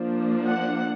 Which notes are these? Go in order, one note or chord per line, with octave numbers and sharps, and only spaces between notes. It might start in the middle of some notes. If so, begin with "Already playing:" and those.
Already playing: F3 A#3 D4
F#5